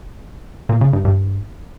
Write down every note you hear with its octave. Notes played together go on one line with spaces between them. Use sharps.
A#2
C#3
G2
G2